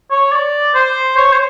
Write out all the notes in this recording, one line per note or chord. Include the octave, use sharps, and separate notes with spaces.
C#5
D5
C5
C#5
C5